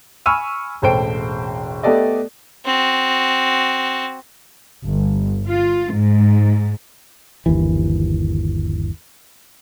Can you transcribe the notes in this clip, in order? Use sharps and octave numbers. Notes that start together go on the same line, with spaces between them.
G#5 B5 C#6 E6 F6 D#7
E1 A1 A4 C5 G5 D7
A3 B3 G4 A4 D5 D#5
C4 F#4
G1
F4
G#2
G1 D#2 E3